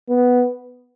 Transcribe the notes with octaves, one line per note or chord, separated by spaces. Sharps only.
B3